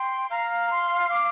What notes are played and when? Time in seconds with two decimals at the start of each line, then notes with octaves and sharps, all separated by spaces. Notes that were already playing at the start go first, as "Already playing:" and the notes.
Already playing: G5 C6
0.30 F5 A#5
0.71 C6
1.10 D6